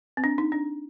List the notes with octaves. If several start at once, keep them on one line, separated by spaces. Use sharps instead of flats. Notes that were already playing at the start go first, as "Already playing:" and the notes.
C4
D4
D#4
D4